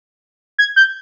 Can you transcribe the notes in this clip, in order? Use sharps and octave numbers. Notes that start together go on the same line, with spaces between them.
G#6
G6